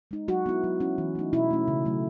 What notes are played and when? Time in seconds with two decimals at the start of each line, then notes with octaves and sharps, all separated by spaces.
0.11 G#3 D#4
0.28 F#3 F#4
0.46 B3 E4
0.64 F#3
0.80 C#4 E4
0.98 E3
1.15 A3 D#4
1.33 B2 E4
1.51 A3 C#4
1.68 C#3
1.85 F#3 A3